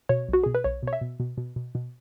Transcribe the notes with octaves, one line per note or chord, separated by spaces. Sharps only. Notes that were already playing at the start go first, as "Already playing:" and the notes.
B2 C#5
B1 F#4
B2 G#4
B4
B1 C#5
B2 C#5
E5
B2
B2
B2
B2
B2